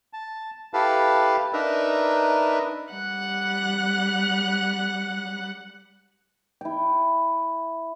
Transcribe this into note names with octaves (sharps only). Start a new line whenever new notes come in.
A5
E4 G4 A4 B4 F5 A5
D4 D#4 A#4 B4 E5
G3 F#5 F#6
E4 G5